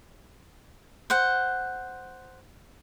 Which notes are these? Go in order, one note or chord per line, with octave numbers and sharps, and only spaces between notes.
C5 F#5